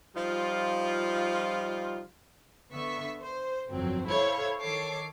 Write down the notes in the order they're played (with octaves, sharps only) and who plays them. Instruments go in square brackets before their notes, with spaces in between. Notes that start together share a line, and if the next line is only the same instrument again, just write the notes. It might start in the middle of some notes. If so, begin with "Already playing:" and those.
[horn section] F3 G3 D#4 F4
[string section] D3 B3 E5 C#6 B6
C5
G1 F2 F#3 C4
E4 A4 C5 C#5 F5
D#3 A4 C#5 D6 C7